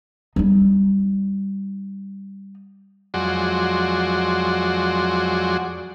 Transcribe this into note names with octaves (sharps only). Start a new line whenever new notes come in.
G3 D#4
F2 F#3 G#3 F#4 D5 C6